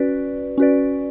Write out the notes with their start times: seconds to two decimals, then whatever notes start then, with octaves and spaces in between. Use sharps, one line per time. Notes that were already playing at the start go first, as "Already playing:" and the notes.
Already playing: C#4 F#4 B4 D5
0.58 C#4 F#4 B4 D5